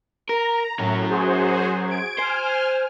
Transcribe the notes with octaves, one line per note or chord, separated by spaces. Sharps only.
A#4 A#5
A2 F#3 C#4
F#4 G#4 C5
G#6 D7
C5 G#5 F6